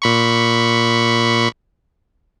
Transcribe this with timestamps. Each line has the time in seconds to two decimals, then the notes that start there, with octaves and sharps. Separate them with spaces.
0.02 A#2 B5 C#6